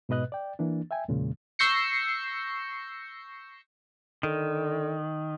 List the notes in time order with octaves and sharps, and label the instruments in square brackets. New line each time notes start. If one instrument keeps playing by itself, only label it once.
[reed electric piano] G#2 B2 B4 D#5 F#6
D5 G5
E3 A#3 D4
E5 G5 G#5
E2 A#2 C#3 G#3
[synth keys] C#6 E6 G6 A#6 C7 C#7
[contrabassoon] D3 [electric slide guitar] D#3